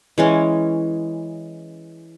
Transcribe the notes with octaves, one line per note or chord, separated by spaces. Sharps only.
E3 G#3 C#4